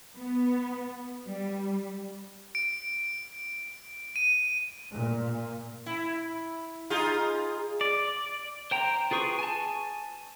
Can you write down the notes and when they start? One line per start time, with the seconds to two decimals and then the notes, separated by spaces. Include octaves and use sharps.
0.16 B3
1.28 G3
2.55 D7
4.16 D#7
4.92 A#2
5.86 E4
6.90 D#4 F4 G#4
7.81 D5
8.71 C5 G5 A#5
9.11 F4 G#4 B4 C#6 D#6
9.39 G#5 A5